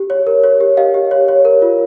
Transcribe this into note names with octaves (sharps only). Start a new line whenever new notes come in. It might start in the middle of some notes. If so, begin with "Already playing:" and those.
Already playing: G4
C#5
A#4
C#5
G4
G4 D#5 F5
G4
C#5
C#5
A#4
F4